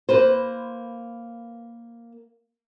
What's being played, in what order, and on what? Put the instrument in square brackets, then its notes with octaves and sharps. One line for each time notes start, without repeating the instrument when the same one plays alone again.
[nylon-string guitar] A#3 B4 C5